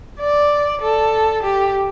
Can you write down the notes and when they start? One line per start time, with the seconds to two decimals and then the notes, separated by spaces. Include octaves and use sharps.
0.20 D5
0.81 A4
1.43 G4